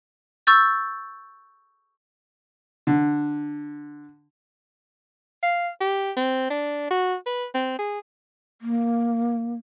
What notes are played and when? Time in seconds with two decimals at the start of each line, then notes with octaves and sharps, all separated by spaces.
0.47 C#6 E6 G6 A6
2.87 D3
5.43 F5
5.81 G4
6.17 C4
6.50 D4
6.91 F#4
7.26 B4
7.54 C4
7.79 G#4
8.61 A#3